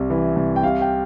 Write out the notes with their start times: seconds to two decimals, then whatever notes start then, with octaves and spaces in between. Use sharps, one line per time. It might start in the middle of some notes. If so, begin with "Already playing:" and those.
Already playing: C2 C3
0.10 E3
0.36 C2
0.56 G5
0.63 C3 F5
0.81 G5